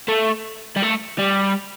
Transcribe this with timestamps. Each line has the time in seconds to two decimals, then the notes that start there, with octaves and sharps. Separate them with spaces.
0.08 A3
0.77 G3
0.83 A3
1.19 G3